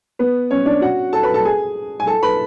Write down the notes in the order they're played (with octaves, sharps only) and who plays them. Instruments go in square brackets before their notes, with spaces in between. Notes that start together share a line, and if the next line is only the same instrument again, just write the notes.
[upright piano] B3 B4
C#4 C#5
D4 D5
F#4 F#5
A4 A5
B4 B5
A4 A5
G#4 G#5
G#5
A4 A5
B4 B5